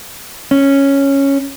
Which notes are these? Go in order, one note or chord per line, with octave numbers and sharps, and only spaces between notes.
C#4